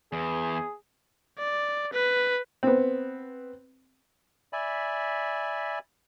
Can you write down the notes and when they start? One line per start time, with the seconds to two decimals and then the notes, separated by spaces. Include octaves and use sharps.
0.12 E2 G#4
1.38 D5
1.93 B4
2.63 B3 C4
4.53 D5 E5 G#5 B5